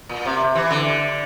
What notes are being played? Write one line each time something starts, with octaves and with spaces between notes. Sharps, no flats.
A#2
C3
E3
D3